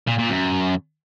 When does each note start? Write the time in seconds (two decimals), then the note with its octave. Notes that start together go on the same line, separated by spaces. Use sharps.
0.08 A#2
0.19 A#2
0.30 F#2